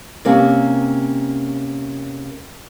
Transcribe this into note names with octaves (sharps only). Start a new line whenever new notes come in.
C3 A#3 C#4